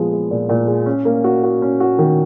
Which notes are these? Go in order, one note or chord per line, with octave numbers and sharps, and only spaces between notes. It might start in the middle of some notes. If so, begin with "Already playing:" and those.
Already playing: A#2 F3 G#3 B3
G#3
A#2
A#2
G#3
C#4
A#3
F#4
F#4
C#4
F#4
D#3